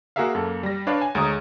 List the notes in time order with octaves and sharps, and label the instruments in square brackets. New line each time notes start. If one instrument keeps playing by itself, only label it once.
[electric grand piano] A#3 F#4 G#4 A#4 E5 F5
F#2 A#3 A4
G3 A#6
D4 B4 C#5 D5 F5
G#5
D2 G#3 C#5 A#5 D#6